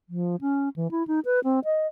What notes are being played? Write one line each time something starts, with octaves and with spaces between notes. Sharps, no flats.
F3
C#4
E3
E4
D#4
B4
C4
D#5